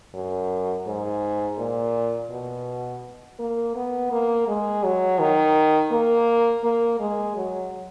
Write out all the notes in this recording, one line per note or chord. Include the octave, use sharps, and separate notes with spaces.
F#2
G#2
A#2
B2
A#3
B3
A#3
G#3
F#3
D#3
A#3
A#3
G#3
F#3